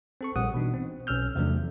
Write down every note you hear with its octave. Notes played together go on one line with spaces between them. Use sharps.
C4 A4 C#6
A#1 G3 F#5 D#6
B2 E3 D4 D#4
C4
B1 C#4 E6 F6 G6
E2 C3 F3 F#3 A3 D4